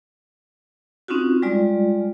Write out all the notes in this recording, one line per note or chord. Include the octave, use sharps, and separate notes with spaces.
C4 C#4 D#4 F4 F#4
G3 G#3 F4 D5